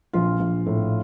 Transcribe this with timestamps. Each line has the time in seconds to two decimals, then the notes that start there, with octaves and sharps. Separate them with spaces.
0.13 A#1 F4
0.40 A#1
0.66 A2